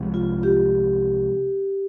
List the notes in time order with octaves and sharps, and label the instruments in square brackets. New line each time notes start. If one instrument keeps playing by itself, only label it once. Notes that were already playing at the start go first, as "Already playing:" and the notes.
Already playing: [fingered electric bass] C2 C3 F3 G#3
[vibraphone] F4
G4